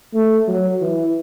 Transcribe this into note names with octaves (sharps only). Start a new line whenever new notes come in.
A3
F#3
E3